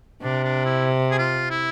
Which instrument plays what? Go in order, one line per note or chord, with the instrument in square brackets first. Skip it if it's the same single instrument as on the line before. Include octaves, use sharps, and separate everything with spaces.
[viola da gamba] C3 [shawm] D4
[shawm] D4
E4
G#4
F4
E4